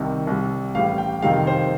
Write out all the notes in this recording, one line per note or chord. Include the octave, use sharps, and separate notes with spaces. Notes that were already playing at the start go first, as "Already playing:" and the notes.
Already playing: C2 C3 D#3 G3
C2 C3 G3
A1 A2 G3 F5
G5
F2 C3 D#3 G3 F5
C5